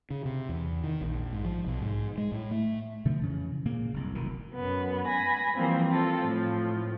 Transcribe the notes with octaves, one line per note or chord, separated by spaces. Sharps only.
C#3
C3
E2
D#3
A#1
G#2
F3
B1
G#2
G#3
A2
A3
B2 D3 F3 A3
F2 C#3 E3
A#2 C#3 A#3
F#1 C2
F1 B2 D#3
F#2 B3
G#5 B5 A#6
E3 F3 G3 A#3 C4
C4 F4 A4
A2 F3